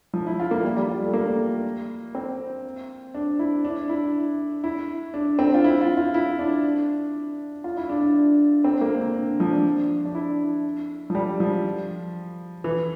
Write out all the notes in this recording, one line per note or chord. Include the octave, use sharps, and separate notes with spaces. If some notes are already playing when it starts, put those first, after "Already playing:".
F3
E4
F4
A#3
G3
G3
F4
A3
A#3
C4
D4
E4
D4
E4
E4
D4
C4
F4
E4
F4
F4
E4
D4
F4
E4
D4
D4
C4
A#3
D3
D3
D3
F3
D4
D4
E4
F3
G3
F3
E3